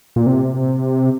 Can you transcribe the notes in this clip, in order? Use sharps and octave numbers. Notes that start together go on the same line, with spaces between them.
A#2
C3